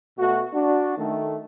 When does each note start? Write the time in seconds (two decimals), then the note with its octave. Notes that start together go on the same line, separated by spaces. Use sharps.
0.19 B2 A3 F#4
0.54 D4 F#4
0.98 D#3 A3